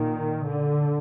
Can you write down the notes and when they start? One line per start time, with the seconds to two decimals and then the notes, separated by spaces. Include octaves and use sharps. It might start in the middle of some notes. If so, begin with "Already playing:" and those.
Already playing: A#2 D#3
0.47 D3